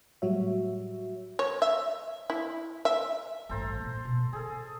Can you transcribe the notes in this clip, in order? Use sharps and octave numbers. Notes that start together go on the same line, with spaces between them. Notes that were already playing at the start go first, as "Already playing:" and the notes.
A2 F#3 G3 F#4 C#5 E5
C#5
E5
E4
E5
A1 G2 A4 C5 A#5
A#2
B2 F4
D3 G#4 A4